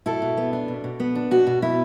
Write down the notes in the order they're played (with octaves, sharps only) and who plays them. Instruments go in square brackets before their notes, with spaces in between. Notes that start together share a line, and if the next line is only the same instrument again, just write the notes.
[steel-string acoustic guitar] B2 E4 A4
B2
B3
D4
B2
B2
B3
D4
B2 F#4
B2
B3 E4